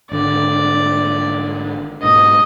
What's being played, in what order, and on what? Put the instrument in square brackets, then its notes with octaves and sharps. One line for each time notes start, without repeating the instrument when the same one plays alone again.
[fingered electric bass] G#1 D3 [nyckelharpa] D5
[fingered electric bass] G#2 B2 [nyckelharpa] D#5